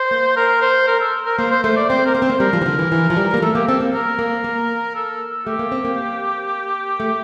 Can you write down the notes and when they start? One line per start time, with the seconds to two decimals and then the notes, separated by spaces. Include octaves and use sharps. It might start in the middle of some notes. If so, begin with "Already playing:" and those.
Already playing: C5
0.11 A#3
0.37 A#4
0.62 C5
0.88 A#4
1.00 A4
1.26 A#4
1.38 A#3 C5
1.51 C5
1.64 A3 C5
1.76 D5
1.89 C4 C5
2.06 A#4
2.15 A#3 C5
2.22 C4
2.30 A#3
2.40 G3 A#4
2.53 F3
2.62 E3
2.66 D3
2.79 E3
2.92 E3
3.10 F3
3.17 G3
3.34 A#3
3.42 A3 A4
3.55 A#3 G4
3.68 C4 A4
3.80 A#3
3.94 A#3 A#4
4.19 A#3
4.44 A#3
4.95 A4
5.47 A3 G4
5.59 A#3
5.72 C4
5.85 A#3
7.00 A3